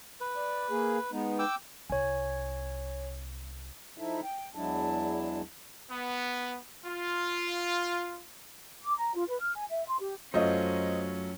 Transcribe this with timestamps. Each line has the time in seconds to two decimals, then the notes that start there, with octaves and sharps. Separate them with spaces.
0.20 B4
0.36 D5
0.70 A#3 G#4
1.12 G#3 B3 D#4
1.39 G5 D6 E6
1.90 C2 C#5 G#5
3.98 F3 D#4 E4 A4 E5
4.23 G5
4.55 E2 F#3 G#3 D4 E4 A5
5.90 B3
6.85 F4
8.82 D6
8.97 A#5
9.15 F4
9.27 B4
9.40 F6
9.55 G#5
9.70 E5
9.88 C6
10.00 G4
10.34 F#2 F#3 A3 C#4 F4 C5 D#5